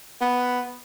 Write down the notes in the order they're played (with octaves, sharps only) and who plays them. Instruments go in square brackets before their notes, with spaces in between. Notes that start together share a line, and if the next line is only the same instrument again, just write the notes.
[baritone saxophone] B3